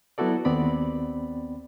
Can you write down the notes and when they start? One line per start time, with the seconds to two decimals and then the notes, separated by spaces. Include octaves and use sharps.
0.18 F#3 B3 E4 F#4 A4 D5
0.45 D#2 B3 C4 D5 B5